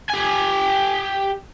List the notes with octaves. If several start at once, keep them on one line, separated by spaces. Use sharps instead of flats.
G4 G#5